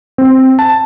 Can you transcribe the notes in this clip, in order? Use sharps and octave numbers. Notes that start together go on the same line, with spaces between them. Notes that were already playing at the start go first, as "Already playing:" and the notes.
C4
A5